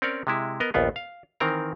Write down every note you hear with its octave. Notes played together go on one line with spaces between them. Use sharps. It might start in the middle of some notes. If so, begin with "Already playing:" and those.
C4 C#4 A#4 C#5 D5
C3 G#3 E4
B3 A#4 D#5
A#1 D#2 B3 F4
F5
D#3 E3 C4 A#4 A#5